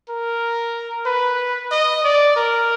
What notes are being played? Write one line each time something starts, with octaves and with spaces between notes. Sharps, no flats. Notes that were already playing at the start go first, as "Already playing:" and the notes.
A#4
B4
D#5
D5
A#4